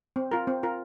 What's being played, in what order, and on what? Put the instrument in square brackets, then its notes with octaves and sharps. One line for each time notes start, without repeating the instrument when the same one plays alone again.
[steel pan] C4
F4 A#4
C4
F4 A#4